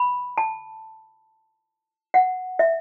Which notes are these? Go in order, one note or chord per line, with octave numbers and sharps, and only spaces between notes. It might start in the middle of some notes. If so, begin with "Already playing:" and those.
Already playing: B5
A5
F#5
E5